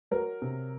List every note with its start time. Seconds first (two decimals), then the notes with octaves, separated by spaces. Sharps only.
0.11 F#3 A#4
0.42 C3